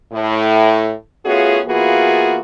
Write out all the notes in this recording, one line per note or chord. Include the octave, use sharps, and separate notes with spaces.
A2
A3 B3 C#4 F4 F#4 G#4
E3 A#3 B3 F4 F#4 G#4